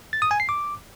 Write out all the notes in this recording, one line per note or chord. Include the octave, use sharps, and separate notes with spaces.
A6
D#6
G#5
C7
D6